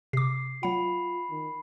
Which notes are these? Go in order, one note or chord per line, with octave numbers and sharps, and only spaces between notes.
C3 D6 C7
F#3 F4 F#5 B5
D#3